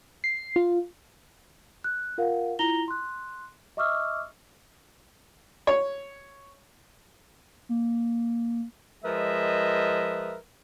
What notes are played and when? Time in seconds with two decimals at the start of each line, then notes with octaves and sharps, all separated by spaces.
0.24 C7
0.56 F4
1.84 F#6
2.18 F4 A#4 F5 F#5
2.59 E4 F4 A#5 A#6 F7 G7
2.88 C6 F#6
3.77 D#5 E5 C#6 D6 E6 F6
5.67 C#5
7.69 A#3
9.04 F3 G#3 A#4 B4 D#5 E5